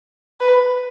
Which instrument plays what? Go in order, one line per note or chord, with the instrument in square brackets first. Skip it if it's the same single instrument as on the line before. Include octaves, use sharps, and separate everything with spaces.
[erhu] B4